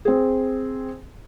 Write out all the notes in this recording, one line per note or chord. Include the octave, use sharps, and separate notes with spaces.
C4 G#4